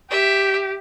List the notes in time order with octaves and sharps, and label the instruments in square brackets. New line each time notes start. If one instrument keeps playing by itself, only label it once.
[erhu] G4 [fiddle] E5